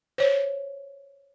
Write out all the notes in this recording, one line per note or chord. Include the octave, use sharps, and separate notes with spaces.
C5 C#5